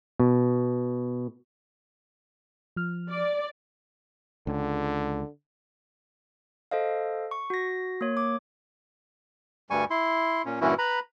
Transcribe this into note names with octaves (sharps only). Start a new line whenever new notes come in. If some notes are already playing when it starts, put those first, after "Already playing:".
B2
F3 F6
D5
C#2 D3
A4 C5 D#5 F5
C#6
F#4 A#6
A#3 C#5
D6
D2 G2 G3 G#5 C#6
E4 C6
A#2 C#4
G2 A#2 E3 C#4 E4 F#4
B4 A#5 B5